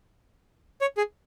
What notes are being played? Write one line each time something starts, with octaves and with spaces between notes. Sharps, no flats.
C#5
G#4